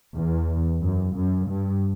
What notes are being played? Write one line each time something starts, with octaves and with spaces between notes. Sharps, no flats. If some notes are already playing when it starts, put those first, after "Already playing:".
E2
F#2
F#2
G2